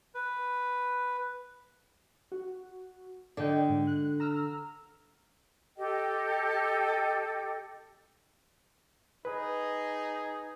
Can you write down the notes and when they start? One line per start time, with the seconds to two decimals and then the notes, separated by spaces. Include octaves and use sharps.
0.15 B4
2.32 F#4
3.37 D3 D5 D#5 G5
3.69 G#2
3.87 F#6
4.20 A#5 E6 F6
5.76 G4 A4 D#5 G5
9.25 D#4 G#4 B4